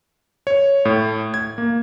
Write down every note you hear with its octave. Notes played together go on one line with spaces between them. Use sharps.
C#5
A2
G#6
A#3